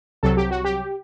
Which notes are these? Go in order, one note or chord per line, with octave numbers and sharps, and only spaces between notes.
C2 C3 F#3 A4
G4
F#4
G4